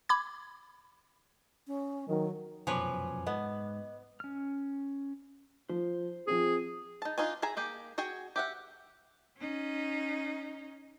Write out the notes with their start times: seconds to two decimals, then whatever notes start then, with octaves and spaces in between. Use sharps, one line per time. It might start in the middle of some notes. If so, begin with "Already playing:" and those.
0.09 B5 D6 G#6
1.67 C#4
2.08 D#3 F#3
2.67 F1 F#2 B2 F3 B4 C#5 G#5 D6
3.27 G#2 B3 D#5
4.20 C#4 F6
5.70 F3 C5
6.27 F3 C4 F4 G#4
7.02 D#4 A5
7.18 D4 D#4 F4 G#5
7.42 G#4 E5 G#5 A#5
7.57 A#3 G4 G#4
7.98 F#4 G#4 G5 G#5
8.36 G4 E5 F#5
9.37 C#4 D#4